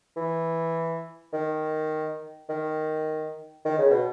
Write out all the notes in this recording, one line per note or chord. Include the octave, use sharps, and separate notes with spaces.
E3
D#3
D#3
D#3
C#3
B2